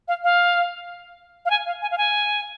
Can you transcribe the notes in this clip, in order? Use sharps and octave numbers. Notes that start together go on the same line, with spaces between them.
F5
F5
F5
G#5
F5
G#5
F5
G#5